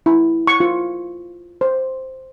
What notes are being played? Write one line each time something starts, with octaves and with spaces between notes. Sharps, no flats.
E4
C#6
F4
C5